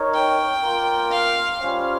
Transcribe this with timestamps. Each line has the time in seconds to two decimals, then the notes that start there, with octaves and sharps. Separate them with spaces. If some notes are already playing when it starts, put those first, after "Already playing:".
Already playing: D#4 A#4 C#5
0.14 G5
0.63 A#3 F4 A#4
1.12 F5
1.61 G3 C#4 F4 C5